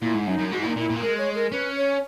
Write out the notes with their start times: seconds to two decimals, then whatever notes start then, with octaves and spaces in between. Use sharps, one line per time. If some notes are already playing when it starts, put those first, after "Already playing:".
0.01 A#2 E4
0.14 G#2
0.27 F#2 D#4
0.39 F#2
0.52 G#2 F#4
0.61 A#2 E4
0.69 D#4
0.77 A#2 E4
0.89 A#2
0.96 A#3
1.01 G#3 A#4
1.18 C#5
1.35 A#4
1.51 C#4 B4
1.77 C#5